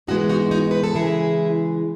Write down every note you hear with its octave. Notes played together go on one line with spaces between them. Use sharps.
G#2 E3 G#3 B3 D#4 F#4
D#4 F#4
D#4 F#4
B4
A4
C#3 E3 G#3 E4 G#4